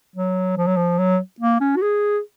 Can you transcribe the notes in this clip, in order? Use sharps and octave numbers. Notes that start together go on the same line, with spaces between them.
F#3
F3
F#3
F3
F#3
A#3
C#4
F#4
G#4